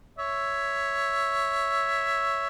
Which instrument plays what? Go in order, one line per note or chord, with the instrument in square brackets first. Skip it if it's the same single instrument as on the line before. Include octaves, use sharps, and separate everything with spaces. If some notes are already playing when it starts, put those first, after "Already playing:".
[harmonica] C#5 E5